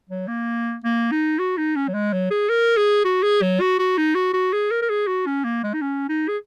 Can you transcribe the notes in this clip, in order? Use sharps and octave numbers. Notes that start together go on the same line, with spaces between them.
F#3
A#3
A#3
D#4
F#4
D#4
C#4
F#3
G#3
F#3
G#4
A#4
G#4
F#4
G#4
F#3
F#4
F#4
D#4
F#4
F#4
G#4
A#4
A#4
G#4
F#4
C#4
A#3
G#3
D#4
C#4
D#4
G#4